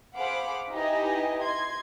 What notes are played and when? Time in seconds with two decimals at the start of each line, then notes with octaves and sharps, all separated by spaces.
0.15 G#4 C5 F5 F#5 B5 D6
0.72 D#4 E4 G4 B4 D#5 G#5
1.44 D#5 C6 G#6